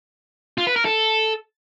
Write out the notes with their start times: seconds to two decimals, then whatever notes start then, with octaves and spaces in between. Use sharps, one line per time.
0.58 F4
0.67 B4
0.76 A#4
0.85 A4